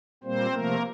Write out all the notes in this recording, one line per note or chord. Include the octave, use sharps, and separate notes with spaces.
A#2 G3 A#3 C4 C5
C3 F3 A3 A#3 A#4